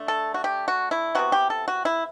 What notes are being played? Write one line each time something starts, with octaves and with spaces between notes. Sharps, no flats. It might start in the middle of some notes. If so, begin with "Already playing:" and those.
Already playing: D3 A3
A4
F#4
G4
F#4
E4
C3 E3 B3 F#4
G4
A4
F#4
E4